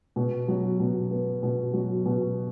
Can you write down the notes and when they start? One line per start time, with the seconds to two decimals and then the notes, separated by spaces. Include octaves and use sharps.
0.16 B2
0.48 F#3
0.80 B2
1.11 B3
1.43 B2
1.73 F#3
2.06 B2